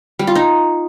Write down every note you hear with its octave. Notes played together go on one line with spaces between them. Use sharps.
G3
F4
D#4